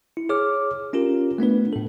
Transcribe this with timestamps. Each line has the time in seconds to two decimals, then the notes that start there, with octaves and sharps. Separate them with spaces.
0.17 E4
0.29 G#4 C#5 D6 F6
0.93 C#4 F4 G4 A#4
1.38 A3 B3 D4 B4
1.73 A2 A4